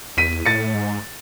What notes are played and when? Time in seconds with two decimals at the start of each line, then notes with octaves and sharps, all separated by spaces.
0.17 E2 B6 D#7
0.46 A2 A6 C#7
0.74 G#2